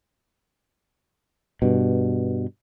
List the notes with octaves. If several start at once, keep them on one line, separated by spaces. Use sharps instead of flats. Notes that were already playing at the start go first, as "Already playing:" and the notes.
G2 B2